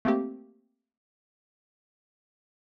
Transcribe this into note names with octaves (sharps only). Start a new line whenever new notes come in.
A3 A#3 C4 G4